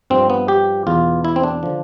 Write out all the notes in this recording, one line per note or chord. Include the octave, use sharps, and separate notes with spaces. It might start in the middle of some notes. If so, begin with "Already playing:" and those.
G2 F3 C4
B3
G4
E2 B2 F4
E4
C4
D4
D3 F3